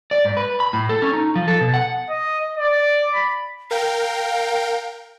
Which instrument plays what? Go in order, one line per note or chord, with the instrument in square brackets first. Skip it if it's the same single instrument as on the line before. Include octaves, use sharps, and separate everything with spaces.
[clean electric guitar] D5
G#2
B4
B5
A2
A4
C#4
D#4
F3
A4
B2
F#5
[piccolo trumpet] D#5
D5
B5
[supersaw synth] A#4 G5 [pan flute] F5